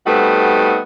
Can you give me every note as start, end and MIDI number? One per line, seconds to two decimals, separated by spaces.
0.06 0.79 55
0.06 0.79 57
0.06 0.79 59
0.06 0.79 60
0.06 0.79 63
0.06 0.79 66